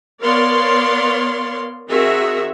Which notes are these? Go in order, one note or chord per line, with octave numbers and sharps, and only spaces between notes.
B3 A#4 C#5 D5 F5 C6
D#3 C4 F#4 G#4 A#4 E5